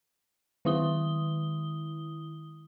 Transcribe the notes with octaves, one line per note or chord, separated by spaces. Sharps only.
D#3 G#3 E4 D#6 G7